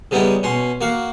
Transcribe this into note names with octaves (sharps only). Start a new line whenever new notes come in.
C#3 G3 B3 D#4 E4
B2 C#4 C6
A#3 F#4 F5